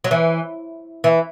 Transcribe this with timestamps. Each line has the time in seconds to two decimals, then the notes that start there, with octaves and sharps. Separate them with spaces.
0.04 F#3
0.11 E3
1.04 E3